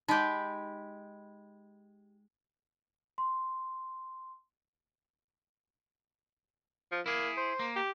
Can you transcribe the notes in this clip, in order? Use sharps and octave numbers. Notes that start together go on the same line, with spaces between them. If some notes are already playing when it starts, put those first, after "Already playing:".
G#3 D#4 G4 B5 G6
C6
F3
A#3 E4 G#4
C5
A#3
G4